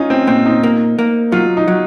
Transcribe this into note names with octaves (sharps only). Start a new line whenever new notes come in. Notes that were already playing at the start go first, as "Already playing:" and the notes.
Already playing: C#4 D#4 F4
C4
A#2 C4
D#4
A#3
A#3
F#3 F4
D#4
F#3